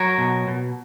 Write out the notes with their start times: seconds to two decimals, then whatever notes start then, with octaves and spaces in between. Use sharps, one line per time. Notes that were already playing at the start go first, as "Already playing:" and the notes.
Already playing: F#3 A#4 C#5
0.18 B2
0.47 B2